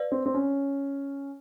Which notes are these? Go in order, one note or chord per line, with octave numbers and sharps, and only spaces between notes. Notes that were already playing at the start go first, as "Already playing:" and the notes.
Already playing: B4 D5 F5
C4
C4
C#4